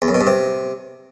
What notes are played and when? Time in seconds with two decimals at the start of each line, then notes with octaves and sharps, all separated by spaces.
0.02 E2
0.08 F#2
0.14 B2
0.21 G2
0.27 C3